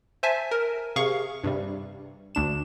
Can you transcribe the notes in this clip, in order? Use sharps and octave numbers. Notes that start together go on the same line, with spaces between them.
C5 E5 G#5 A5
A#4
C3 G#4 F5 C#6
G2 C3 G3
D2 D4 E7